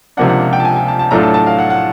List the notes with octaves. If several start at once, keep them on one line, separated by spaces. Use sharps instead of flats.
C#2 C3 F3 A#3 D4 F#5
F#5
G5
A5
G#5
G#5
A5
A5
A2 F#3 A3 D4 F4 A#5
A5
A5
F5
F#5
F#5